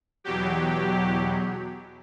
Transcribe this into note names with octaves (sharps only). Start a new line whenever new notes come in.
E2 B2 F#3 G4